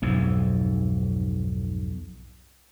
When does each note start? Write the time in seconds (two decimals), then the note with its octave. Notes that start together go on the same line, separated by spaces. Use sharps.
0.02 B1 F2 G#2